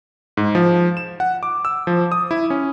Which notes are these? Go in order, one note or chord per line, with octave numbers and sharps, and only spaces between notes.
G#2
F3
E7
F#5
D6
E6
F3
D#6
E4
C#4